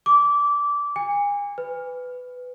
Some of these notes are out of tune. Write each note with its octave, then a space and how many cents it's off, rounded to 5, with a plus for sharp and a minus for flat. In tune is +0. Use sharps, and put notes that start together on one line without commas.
D6 -20
G#5 -35
B4 +15